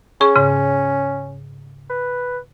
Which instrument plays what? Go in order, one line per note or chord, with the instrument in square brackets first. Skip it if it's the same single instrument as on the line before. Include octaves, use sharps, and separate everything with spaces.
[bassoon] C#4 [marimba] G#4 C#6
[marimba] G#2 C#3
[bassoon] B4